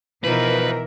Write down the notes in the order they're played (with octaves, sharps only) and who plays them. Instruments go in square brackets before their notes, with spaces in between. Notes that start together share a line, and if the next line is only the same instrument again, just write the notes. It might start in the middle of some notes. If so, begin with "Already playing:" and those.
[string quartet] B2 D#4 [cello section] E3 A#4 E5 [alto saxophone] F3 [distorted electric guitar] B4